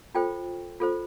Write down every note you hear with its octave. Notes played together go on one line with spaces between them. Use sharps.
F4 A4 C5 G5
F4 A4 C5